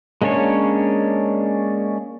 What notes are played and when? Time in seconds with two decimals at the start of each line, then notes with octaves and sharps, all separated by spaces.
0.22 G#3 A#3 C#4 D4 C#5